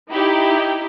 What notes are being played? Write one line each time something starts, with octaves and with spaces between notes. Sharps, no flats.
D#4 E4 G4